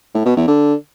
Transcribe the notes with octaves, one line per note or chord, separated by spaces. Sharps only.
A2
B2
E2
D3